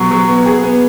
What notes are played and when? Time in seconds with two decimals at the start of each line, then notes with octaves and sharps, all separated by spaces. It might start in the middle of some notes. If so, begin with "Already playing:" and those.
Already playing: B2 F#3 F#4
0.11 F#3
0.28 B3
0.46 G#4
0.63 B3